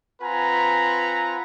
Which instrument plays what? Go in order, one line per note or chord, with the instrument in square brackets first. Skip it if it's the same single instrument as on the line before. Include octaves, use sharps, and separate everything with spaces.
[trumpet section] C4 F4 B4 F#5 G#5 A#5